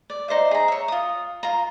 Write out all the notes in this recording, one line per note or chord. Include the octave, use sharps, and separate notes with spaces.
D5
D#4 C5 D5 E5
G#4 A#5
C#5 E5
F4 D#6
F4 A#5